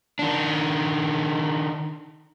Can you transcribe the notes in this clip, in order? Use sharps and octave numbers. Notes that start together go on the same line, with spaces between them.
D#3 D4